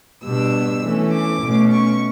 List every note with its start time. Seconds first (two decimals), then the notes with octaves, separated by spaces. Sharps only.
0.23 B2 G3 D4 E6
0.83 E3 A3 C#4
1.12 D6
1.42 B2 A3 C#4
1.71 C#6